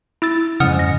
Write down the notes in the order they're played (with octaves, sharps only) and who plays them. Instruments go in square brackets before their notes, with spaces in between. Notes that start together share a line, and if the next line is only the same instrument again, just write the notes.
[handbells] E4 E6 A6
[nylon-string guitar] F2 G#2 [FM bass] C#3 [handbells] F#5 D#6 F6
[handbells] A#6